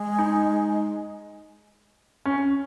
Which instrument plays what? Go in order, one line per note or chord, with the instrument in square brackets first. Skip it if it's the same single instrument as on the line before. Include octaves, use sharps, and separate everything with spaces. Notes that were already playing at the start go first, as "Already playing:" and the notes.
Already playing: [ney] G#3
[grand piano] D#4
C#4